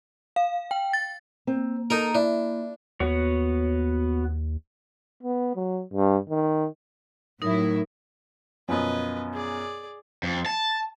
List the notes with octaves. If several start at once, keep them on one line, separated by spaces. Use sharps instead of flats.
F5
G5
A6
A#3 C4
D#4 A4 A#4
D4 E4
D#2 B3 F#4 C#5
B3
F#3
G2
D#3
A2 F#3 D#4 E4 A#4 D#6
F#2 B2 F3 B4 D#5
G#4 D5
F2
A5